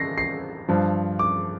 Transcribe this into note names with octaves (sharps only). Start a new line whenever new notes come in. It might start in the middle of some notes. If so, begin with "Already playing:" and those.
Already playing: A#6 C7
C7
G2 F3
D6